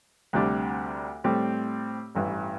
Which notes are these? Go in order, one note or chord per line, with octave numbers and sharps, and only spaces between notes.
D2 C3 G3 D4
A2 G3 C4 G4
A1 G2 E3